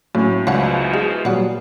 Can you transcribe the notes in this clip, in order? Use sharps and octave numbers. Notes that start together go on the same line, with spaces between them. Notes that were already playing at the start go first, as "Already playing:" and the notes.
A2 F#3 A#3 C#4
C#2 B2 E3 F3 C#5 D5 F#5
G#3 G#4
A#2 F#3 G3 B4 F#5